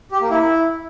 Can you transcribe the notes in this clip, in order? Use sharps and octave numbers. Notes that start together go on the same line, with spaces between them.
G4
A#3
E4